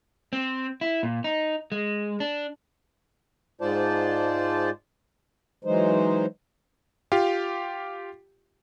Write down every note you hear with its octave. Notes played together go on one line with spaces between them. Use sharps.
C4
E4
A#2
D#4
G#3
D4
G#2 G#3 F4 C5 D5 A5
E3 F#3 G#3 D#4 C5
F4 G4 F5